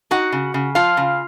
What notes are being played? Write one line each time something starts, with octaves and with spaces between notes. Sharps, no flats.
D#4 F#4 F#5
C#3
C#3
F3 F4 F5
C#3